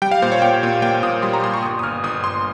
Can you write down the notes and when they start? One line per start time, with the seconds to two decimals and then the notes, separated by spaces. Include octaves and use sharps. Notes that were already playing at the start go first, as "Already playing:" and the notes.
0.02 G3 G5
0.11 F5
0.22 A#2 C5
0.32 C#5
0.42 A#2 G5
0.63 A#2
0.82 A#3 G5
1.03 A#2 D#6
1.22 G3 C6
1.33 A#5
1.44 A#2 C6
1.54 C#6
1.63 G1 D#6
1.79 D#6
1.83 G1 F6
2.03 G1 D#6
2.24 G1 C6